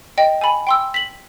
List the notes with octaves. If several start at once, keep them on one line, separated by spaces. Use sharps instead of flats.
D#5 G5
G#5 B5
G5 C6 E6
B6 F#7